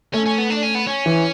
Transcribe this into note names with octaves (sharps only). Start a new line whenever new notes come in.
A3 C#4
C#4
B3
D4
C#4
B3
C#4
E3